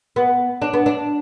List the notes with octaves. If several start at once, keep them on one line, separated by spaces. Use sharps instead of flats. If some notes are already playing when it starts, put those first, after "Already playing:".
B3
D4
B3
D4